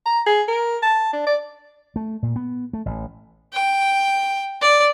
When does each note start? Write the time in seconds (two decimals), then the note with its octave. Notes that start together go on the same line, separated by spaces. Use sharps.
0.06 A#5
0.26 G#4
0.48 A#4
0.83 A5
1.13 D4
1.27 D5
1.96 A3
2.23 A#2
2.36 B3
2.73 A3
2.86 A1
3.54 G5
4.61 D5